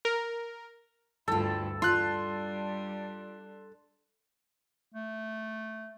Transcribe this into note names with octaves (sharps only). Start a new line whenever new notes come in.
A#4
D2 G2 E4 F4 A4 G5
G3 D4 F4 C6 F#6
A3